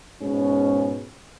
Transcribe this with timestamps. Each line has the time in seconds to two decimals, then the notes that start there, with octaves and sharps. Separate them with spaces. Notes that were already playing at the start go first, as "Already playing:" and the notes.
0.20 G#2 B2 C#4